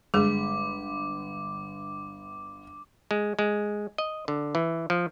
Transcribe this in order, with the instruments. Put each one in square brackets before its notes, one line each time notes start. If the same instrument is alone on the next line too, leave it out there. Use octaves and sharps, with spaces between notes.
[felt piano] G1 [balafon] G#3 G#4 [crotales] D6
[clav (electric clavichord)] G#3
G#3
D#5
D3
E3
F3